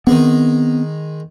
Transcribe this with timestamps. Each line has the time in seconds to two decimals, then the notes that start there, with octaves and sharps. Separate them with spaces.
0.07 D#3 G#3 B3 C4